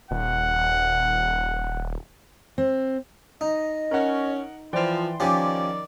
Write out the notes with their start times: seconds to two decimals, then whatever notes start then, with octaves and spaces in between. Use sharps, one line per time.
0.11 D#1 F#5
2.58 C4
3.41 D#4 D#5
3.91 C#4 A#4 F#5
4.73 E3 F3 D5 G5 C6
5.20 D#3 F3 C#4 G4 D5 G#5 D6